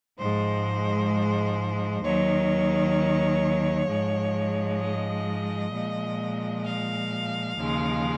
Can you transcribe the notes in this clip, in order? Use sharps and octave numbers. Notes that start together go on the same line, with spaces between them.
G#2 F3 G#3 C5
D#2 D#3 F#3 C#5
G#2 F3 G#3
D#5
A#2 F3 G#3
F5
D#2 C#3 F3 G#3